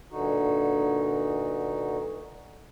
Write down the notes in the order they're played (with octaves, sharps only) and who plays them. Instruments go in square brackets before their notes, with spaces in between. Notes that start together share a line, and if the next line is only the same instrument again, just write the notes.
[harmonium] G2 A#2 D3 D#4 F#4